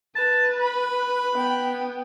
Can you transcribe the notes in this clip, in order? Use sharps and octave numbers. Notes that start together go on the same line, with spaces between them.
B4 A5
B5
B3 G5